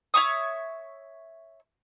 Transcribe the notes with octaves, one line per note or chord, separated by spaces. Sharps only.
C#5 E5 C#6 D#6